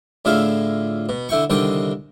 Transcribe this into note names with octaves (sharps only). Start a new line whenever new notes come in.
A2 D3 F4 G#4 E5 F5
B2
D3 E4 G5 C#6
C2 D3 D#3 D4 G5 C6